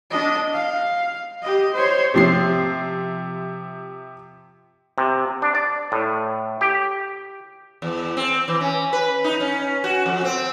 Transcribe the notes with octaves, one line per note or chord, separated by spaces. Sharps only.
D4 D#5
F5
G4 D#5
C5 C#5
C3 F3 C7
C3
D4
D5
A2
G4
E2
C4
E3
C#4
B4
D#4
C#4
F#4
F2
C4